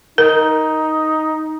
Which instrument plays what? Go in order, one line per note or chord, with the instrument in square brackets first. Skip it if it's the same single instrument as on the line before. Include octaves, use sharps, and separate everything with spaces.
[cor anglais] D#4 [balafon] A#4